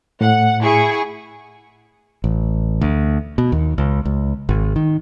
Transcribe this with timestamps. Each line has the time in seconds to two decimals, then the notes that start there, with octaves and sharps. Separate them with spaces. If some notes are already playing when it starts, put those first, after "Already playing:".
0.21 A2 F#5
0.63 E4 G#4 C#6
2.24 A1
2.81 D2
3.38 B2
3.52 D#2
3.78 C#2
4.05 C#2
4.49 G#1
4.76 D#3